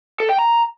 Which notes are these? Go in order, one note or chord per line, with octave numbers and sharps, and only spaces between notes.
A4
G5
A#5